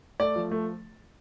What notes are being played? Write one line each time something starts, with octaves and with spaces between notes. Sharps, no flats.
A3 D5
F3
A3